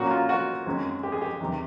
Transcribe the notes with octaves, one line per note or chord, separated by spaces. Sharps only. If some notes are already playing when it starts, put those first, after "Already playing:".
Already playing: A#2 F#3 A#3 C#4 F#4
F4
F#4
F#2 D#3 G#3 C4
G4
G#4
G4
E2 C3 D#3 G3